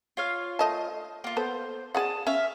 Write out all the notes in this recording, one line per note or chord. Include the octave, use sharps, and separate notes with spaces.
F4 C#5 F5
A3 D#5 A5
A#3 F4
B3 A4 C5 F#5
G#4 D5 F#5 A5 D#6
C#4 E5 F5